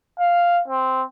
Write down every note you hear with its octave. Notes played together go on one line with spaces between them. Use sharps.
F5
C4